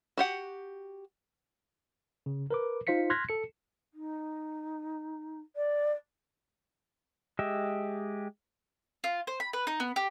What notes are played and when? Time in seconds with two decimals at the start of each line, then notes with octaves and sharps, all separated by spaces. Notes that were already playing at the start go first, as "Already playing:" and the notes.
0.18 F#4 G4 F#5
2.26 C#3
2.51 A#4 B4 D6
2.87 D#4 F4 C5 F5 B6 C#7
3.10 C6 F6 F#6 G#6 A#6 B6
3.29 A4 C#7
3.94 D#4
5.56 D5
7.39 G#3 G4 D#5 E5
9.04 F4
9.27 C5
9.40 B5
9.53 B4
9.67 D#4
9.80 B3
9.96 G4